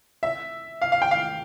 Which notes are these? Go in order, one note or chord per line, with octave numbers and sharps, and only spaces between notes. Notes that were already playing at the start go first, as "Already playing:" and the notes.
E5
F5
F5
G5
F5